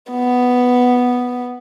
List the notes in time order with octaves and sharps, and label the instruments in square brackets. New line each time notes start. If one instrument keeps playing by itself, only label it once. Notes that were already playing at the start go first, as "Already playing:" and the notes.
[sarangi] B3